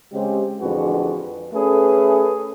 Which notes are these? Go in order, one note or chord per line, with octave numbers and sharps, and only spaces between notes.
C#3 G#3 C4 G4
A1 F2 D3 F#4 G#4 B4
A3 C#4 G#4 A4 B4